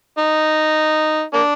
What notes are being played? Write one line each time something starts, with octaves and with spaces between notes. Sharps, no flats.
D#4
A#3 D4